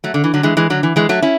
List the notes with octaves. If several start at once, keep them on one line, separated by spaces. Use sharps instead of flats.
F#3 A3
D3
E3
D3 F#3
E3 G#3
E3 G#3
D3 F#3
E3
E3 G#3
F#3 A3
C#4 E4